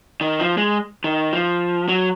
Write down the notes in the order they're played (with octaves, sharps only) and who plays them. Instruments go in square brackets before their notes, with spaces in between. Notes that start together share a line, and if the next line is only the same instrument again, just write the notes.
[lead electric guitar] D#3
F3
G#3
D#3
F3
F#3